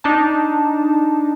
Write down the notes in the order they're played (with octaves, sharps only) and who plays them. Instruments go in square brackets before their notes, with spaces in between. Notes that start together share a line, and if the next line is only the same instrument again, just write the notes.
[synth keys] D4 D#4 A5